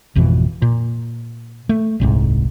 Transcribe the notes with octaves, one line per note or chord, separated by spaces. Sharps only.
G#1 F2 B2 E3
A#2
A3
D#1 C2 G#2